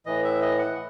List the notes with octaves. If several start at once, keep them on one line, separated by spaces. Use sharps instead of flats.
A2 E3 D#5
E5
D#5
F#5